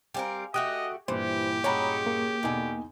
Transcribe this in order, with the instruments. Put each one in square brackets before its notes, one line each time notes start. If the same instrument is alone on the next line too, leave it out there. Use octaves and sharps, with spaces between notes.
[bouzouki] G3 C4 A#4 [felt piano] F5 G#5
[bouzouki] A3 F#4 G4 [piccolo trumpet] D#5 [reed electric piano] D#6 F#6
[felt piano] G2 A#2 E4 [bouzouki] E3 [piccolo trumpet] G4 [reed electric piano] C5
[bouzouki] G#3 C#4 F#4 [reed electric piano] C#5 A#5 B5
[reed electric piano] A#3
[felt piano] E2 D#4 G#5 [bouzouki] B2 D3